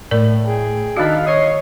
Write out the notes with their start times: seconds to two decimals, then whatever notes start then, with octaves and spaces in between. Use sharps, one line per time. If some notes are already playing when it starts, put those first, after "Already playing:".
0.11 A2 A3 A#4 D5
0.47 G#4 G5
0.97 D#3 D4 D#4 F#4 A4 F5 F#6 B6
1.26 C#5 D#5 D#6 C7